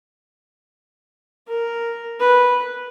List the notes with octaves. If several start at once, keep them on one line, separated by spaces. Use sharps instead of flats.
A#4
B4